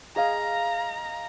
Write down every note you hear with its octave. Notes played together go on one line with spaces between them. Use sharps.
G#4 D#5 F5 A#5